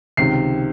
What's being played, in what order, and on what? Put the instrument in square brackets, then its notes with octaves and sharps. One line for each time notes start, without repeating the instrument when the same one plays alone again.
[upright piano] C#2 C3 D#3 C7